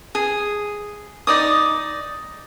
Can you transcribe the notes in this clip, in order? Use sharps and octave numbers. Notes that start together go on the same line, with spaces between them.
G#4
D#4 D5 D#6